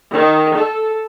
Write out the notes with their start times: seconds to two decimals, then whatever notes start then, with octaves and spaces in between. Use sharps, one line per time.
0.12 D#3
0.56 A4